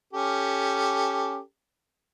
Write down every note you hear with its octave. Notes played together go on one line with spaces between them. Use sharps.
C#4 G4 A4